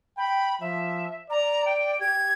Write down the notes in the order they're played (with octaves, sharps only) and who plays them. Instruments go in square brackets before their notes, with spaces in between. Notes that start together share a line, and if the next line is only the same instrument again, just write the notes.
[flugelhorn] G5 [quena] B5
[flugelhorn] F3 [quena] E5
[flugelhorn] D5 [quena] A#5
[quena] G5
[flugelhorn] G4 [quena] G#6